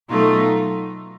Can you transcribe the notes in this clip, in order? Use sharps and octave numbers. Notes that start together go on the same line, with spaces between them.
B2 F#3 A3 D#4 F4